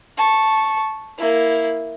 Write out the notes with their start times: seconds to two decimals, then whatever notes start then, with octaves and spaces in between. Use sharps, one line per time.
0.18 A5 C#6
1.19 A#3 E4